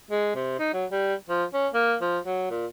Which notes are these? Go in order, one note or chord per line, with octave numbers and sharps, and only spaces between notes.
G#3
C3
D#4
F#3
G3
F3
C#4
A#3
F3
F#3
A#2